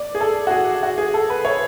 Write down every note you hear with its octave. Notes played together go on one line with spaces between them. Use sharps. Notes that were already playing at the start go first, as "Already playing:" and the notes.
Already playing: D5
G#4
A4
F#4
G#4
F#4
G#4
A4
B4
C#5